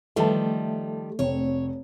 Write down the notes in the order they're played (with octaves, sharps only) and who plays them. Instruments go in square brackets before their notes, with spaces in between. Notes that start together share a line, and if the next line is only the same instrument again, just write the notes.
[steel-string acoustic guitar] D#3 F3 G3 [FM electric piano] A3 [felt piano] B4 A5
[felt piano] F1 C4 [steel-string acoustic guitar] C#5